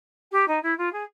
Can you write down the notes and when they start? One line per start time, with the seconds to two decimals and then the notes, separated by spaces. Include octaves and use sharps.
0.31 G4
0.48 D#4
0.63 E4
0.78 F4
0.92 G#4